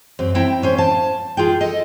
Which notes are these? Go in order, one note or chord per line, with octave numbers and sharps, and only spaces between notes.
F#2 C4
C4 E4 G5 A#5
A2 C#4 C5
F5 A5
F4 G#4 G5
A4 D#5